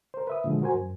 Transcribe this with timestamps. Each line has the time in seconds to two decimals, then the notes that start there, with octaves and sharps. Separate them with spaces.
0.14 A#4 C5
0.27 B4 E5 D#6
0.44 A#2 D3 F3 G#3
0.62 F#4 A#4 C5 G#5
0.74 F#2